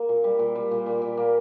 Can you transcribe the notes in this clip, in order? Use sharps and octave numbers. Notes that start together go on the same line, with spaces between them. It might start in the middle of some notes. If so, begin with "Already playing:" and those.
Already playing: A#3
A#2
G3
A#2
G3
A#2
A#2
A#2
A#3